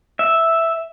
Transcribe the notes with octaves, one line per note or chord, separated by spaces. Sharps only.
E5